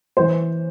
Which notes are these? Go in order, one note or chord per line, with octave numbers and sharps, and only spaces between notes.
C5
E3